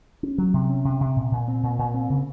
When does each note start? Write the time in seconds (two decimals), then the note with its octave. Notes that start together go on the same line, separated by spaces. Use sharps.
0.23 C#4
0.38 F#3
0.54 C3
0.70 C#4
0.85 C3
1.01 C3
1.16 A#2
1.32 A#2
1.48 C4
1.63 A#2
1.79 A#2
1.94 C4
2.10 C#3